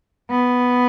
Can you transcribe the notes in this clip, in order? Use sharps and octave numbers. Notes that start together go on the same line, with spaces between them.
B3